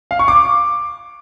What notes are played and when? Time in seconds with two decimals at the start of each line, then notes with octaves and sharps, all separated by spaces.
0.11 F5
0.19 C#6
0.28 D6